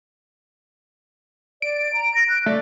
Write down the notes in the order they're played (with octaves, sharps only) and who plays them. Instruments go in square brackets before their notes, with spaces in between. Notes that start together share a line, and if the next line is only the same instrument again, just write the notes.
[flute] D5 [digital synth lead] D7
[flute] A#5
A#6
F#6
[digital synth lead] A3 [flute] D5